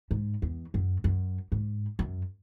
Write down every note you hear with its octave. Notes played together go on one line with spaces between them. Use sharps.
G#2
E2
F#2
F#2
G#2
F#2